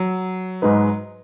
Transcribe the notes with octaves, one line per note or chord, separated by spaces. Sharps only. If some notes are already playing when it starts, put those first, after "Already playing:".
Already playing: F#3
G#2 G#3 D#4 B4